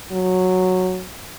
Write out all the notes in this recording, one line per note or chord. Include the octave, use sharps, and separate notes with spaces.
F#3